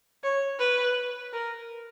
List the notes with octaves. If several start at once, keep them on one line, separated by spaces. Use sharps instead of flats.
C#5
B4
A#4